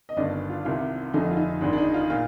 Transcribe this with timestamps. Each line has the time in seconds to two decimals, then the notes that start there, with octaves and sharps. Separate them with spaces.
0.09 D#5
0.17 G1 G2 D#3 D5
0.50 F4
0.65 C2 C3 D#3 F4
1.14 F1 F2 D3 D#4
1.31 F4
1.37 D#4
1.61 G#1 G#2 D#3 D4
1.73 D4
1.78 D#4
1.94 F4
2.10 A#2 F4